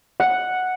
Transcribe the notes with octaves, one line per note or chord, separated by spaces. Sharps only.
F#5